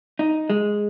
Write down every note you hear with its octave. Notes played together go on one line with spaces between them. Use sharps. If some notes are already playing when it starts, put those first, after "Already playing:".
D#4
G#3